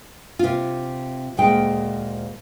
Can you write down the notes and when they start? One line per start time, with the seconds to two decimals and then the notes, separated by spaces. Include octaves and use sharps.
0.39 C3 F4
1.37 D2 A#2 G#3 G5